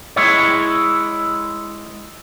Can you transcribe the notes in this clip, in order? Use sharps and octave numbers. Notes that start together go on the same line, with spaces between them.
G#3 E4 C#5